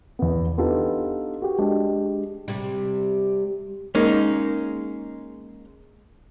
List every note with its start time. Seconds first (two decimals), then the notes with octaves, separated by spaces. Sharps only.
0.19 E2 B3
0.58 B3 D4 D#4 F4 G4 A4
1.42 F#4 G4
1.58 G#3 D4 G4 D#5
2.48 C3 G3
3.95 G#3 A#3 C#4 D#4